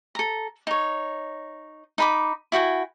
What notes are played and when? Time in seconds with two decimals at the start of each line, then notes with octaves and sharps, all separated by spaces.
0.15 A4 A#5
0.67 D#4 C#5
1.98 D#4 B5 D6
2.52 E4 F#4 G5 G#5